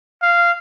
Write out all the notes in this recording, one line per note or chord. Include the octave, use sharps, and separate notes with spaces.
F5